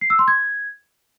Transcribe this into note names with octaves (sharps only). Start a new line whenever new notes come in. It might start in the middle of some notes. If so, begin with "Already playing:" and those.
C7
E6
C6
G#6